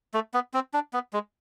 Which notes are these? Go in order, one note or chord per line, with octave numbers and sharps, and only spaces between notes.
A3
B3
C4
D4
B3
G#3